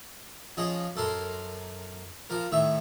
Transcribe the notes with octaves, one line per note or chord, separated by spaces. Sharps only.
F3 C#4 G#4 D#5
F#2 A4 A#4 C6
F3 A#4
A2 D#3 E5 C#6